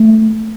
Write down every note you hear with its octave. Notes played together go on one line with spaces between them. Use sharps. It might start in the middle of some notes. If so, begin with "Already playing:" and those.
Already playing: A3